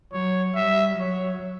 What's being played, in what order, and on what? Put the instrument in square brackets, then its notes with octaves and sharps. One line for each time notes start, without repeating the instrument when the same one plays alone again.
[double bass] F#3 [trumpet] C#5
[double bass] G3 [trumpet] E5
[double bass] F#3 [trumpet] C#5